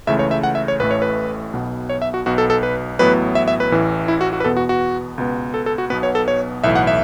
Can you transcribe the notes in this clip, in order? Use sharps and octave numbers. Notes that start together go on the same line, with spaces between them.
C#2 C#3 E3 A3 E5
C#5
E5
F#5
E5
C#5
A1 A2 A3 B4
C#5
B4
B1 B2 B3
C#5
E5
F#4
B1 B2 B3 F#4
A4
A4
B4
A1 A2 F#3 B3 B4
E5
E5
B4
A1 A2 E3
E4
F#4
F#4
B4
E2 B2 B3 A4
F#4
F#4
C#2 B2 B3
A4
A4
F#4
B1 B2 B3 B4
C#5
A4
C#5
B1 A2 E3 E5
F#5
E5